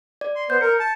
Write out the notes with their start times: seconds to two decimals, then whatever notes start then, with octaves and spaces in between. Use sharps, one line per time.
0.21 D5
0.36 C6
0.50 B3 C5 G6
0.61 A#4 C#7
0.80 A5